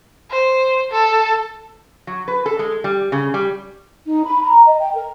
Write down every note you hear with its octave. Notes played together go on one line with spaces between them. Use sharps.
C5
A4
F#3
B4
A4
G#3
G3
C#3
G3
D#4
B5
A#5
D#5
G5
A#4